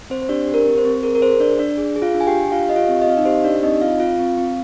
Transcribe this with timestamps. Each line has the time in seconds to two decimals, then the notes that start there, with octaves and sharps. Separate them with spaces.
0.10 C4 C5
0.22 C5
0.29 D4 G4 D5
0.47 G4
0.54 A#4
0.66 C4
0.78 C5
0.84 C4
1.03 G#4 A#4
1.15 A#4
1.22 G#4 C5
1.40 D4 D5
1.59 D4 D5
1.78 G#4
1.96 G#4
2.02 F4 F5
2.14 D4
2.21 G#5
2.27 G4 G5
2.33 D4
2.51 F4 G4 F5
2.69 G4 D#5
2.76 F4 F5
2.89 C4
3.02 D#5
3.07 C4 F5
3.17 D#4 D#5
3.25 G4 C5
3.44 D4 G4 D5
3.63 C4 D#4 D#5
3.82 C4 F4 F5
4.00 F4 F5
4.19 C4
4.37 C4